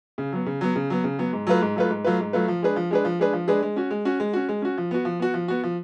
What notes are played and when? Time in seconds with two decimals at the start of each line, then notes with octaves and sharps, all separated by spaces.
0.18 C#3
0.32 F#3 B3
0.46 C#3
0.61 F#3 B3
0.76 C#3
0.90 F#3 B3
1.04 C#3
1.18 F#3 B3
1.33 G#2
1.47 F#3 A3 F4 B4
1.61 G#2
1.76 F#3 A3 F4 B4
1.90 G#2
2.04 F#3 A3 F4 B4
2.20 G#2
2.33 F#3 A3 F4 B4
2.48 F3
2.62 G#3 D4 G#4 B4
2.76 F3
2.91 G#3 D4 G#4 B4
3.05 F3
3.19 G#3 D4 G#4 B4
3.33 F3
3.48 G#3 D4 G#4 B4
3.63 G#3
3.76 C#4 F#4
3.91 G#3
4.05 C#4 F#4
4.20 G#3
4.33 C#4 F#4
4.49 G#3
4.62 C#4 F#4
4.78 F3
4.91 B3 F#4
5.05 F3
5.20 B3 F#4
5.34 F3
5.48 B3 F#4
5.63 F3